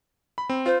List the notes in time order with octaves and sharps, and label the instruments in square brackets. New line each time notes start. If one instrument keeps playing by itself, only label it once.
[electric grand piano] B5
C4
[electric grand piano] F4 [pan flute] C5